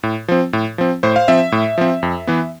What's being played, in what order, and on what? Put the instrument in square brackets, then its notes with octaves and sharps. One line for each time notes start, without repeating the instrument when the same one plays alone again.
[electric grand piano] A2
F3 C4
A2
F3 C4
A2 C5
F5
F3 C4 E5
A2
F3 C4
F2
E3 B3